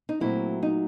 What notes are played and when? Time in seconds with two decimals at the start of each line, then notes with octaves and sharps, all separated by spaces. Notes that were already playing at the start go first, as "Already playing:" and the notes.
0.09 D#4
0.21 A#2 F#3 A3 C4 E4
0.63 D#4